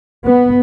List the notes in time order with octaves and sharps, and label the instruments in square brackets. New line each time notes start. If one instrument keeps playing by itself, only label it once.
[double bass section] B3